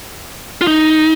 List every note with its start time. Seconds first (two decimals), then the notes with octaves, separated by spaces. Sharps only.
0.61 F4
0.67 D#4